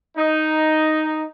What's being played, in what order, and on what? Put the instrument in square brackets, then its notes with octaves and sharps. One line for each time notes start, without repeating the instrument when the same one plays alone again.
[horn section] D#4